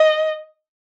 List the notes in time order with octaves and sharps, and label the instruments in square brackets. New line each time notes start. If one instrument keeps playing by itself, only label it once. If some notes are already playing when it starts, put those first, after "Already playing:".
Already playing: [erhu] D#5